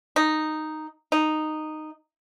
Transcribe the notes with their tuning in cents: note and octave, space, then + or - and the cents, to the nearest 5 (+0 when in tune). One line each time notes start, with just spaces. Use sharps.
D#4 -5
D#4 -10